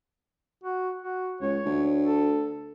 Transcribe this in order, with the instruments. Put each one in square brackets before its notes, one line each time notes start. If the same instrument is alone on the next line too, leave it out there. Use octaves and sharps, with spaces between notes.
[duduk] F#4
F#4
[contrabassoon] C#2 [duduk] C#5
[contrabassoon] D2
[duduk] A4